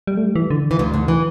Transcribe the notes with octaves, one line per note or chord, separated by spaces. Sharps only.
G3
A3
G3
E3
D3
E3
D2 D3
D2 D3
E3